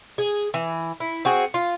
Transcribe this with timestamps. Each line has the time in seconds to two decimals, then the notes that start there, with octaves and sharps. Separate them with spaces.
0.18 G#4
0.54 E3
1.00 E4
1.25 C4 F#4 G#4
1.54 F4